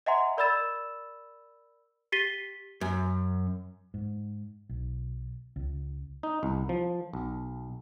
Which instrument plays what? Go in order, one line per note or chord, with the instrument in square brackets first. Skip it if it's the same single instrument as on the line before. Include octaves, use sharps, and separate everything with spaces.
[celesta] D#5 E5 F#5 G#5 A#5 C6
A#4 D5 B5 E6 A6 E7
G4 A6 B6 C7 D#7 G7
[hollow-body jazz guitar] F#2
[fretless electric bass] G#2
B1
C#2
[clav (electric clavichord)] D#4
C2
F3
B1